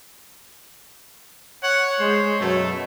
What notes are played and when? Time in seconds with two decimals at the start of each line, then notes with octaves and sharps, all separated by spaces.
1.63 C#5 F#5
2.00 G#3 C5
2.41 F#2 B2 F#3 A3